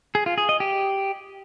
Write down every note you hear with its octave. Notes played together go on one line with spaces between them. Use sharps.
G#4
F4
G#4
D#5
G4